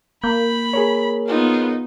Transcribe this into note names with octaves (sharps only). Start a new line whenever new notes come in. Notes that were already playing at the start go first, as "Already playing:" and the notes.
A#3 B5 G6
G#4 A#4 C#5
B3 D#4 F4